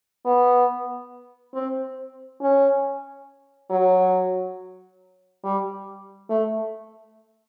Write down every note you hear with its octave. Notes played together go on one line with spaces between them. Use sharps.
B3
C4
C#4
F#3
G3
A3